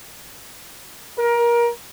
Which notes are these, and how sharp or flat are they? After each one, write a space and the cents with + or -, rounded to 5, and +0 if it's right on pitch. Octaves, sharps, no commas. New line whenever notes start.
A#4 +25